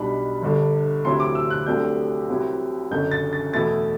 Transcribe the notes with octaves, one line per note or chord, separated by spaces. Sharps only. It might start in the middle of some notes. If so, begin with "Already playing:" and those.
Already playing: B1 B2 G3 D4 B5
G1 G2 D3
D2 C3 F#3 C4 E4 C6
D6
E6
F#6
C2 C3 F#3 A3 D4 G6
C2 C3 F#3 C4 E4
F#1 F#2 D3 G6
A6
A6
E2 B2 A3 E4 A6